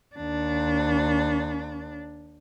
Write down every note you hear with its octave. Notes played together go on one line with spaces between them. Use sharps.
D#2 D4